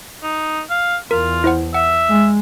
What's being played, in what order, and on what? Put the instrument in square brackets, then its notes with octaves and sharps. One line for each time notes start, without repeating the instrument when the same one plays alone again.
[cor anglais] D#4
F5
[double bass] E2 [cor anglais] F4 [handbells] A#4
[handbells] E4 C5 F#5
[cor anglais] E5 [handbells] F#5
[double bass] G#3